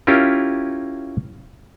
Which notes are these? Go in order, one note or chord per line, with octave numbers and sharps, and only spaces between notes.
C#4 E4 F4 G4 A#4